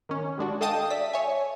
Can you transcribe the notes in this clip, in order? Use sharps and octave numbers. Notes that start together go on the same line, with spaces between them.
D#3 C#4
G3 G#3 D4 F#4
A4 D#5 F5 G5 A5 D#6
D5 E5 B6
C#5 E5 G#5